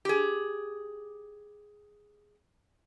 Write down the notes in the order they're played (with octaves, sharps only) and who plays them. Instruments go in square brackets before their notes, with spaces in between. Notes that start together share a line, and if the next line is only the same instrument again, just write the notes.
[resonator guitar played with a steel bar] G4 G#4